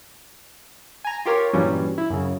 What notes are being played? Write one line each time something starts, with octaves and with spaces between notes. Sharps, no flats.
G#5 A#5
F4 G4 A#4 C#5
G2 A#2 E3 F#3 G3 C#4
E4
F#2 C#3